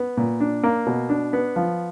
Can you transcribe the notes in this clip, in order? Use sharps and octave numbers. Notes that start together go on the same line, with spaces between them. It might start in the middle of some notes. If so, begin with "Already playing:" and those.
Already playing: B3
A#2
D4
A#3
B2
D4
B3
F3